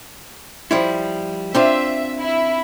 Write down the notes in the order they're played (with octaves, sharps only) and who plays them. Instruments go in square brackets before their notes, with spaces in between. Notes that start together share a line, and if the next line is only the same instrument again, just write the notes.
[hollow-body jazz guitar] F3 G3 E4
[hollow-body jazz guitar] C4 D4 F4 [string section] E5
[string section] E4